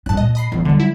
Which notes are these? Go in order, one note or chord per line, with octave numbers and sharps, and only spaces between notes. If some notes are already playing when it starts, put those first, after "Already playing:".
G2 D4 A5 F#6
A#2 D#5
D#5 B5 C7
E2 F3
D3 F#3 G3
E4